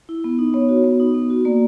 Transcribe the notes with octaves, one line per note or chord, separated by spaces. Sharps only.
E4
B3
D#4
B3 C#5
F#4
B3
D#4
B3
F#4
A#3 D5